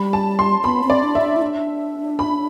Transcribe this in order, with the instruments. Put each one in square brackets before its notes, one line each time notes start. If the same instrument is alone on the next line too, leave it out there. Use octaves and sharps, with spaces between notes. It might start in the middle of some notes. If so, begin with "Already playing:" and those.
Already playing: [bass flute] G3 [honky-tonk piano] B5
[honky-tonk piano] A5
C6
[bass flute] B3 [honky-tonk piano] B5
[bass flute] C4
[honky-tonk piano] D5
[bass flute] D4
[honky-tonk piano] E5
[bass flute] D4
E4
D4
[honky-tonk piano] B5